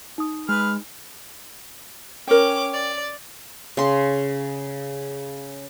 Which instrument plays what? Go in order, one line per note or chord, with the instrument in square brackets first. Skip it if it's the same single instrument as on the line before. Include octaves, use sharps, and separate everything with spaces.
[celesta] D#4 D#6
[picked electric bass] G#3 [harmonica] B4 F6
[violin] C#4 D6 [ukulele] A#4 G5
[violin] D5
[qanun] C#3 C6